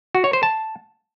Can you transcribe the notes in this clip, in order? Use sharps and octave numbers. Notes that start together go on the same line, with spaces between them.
F#4
C#5
C5
A5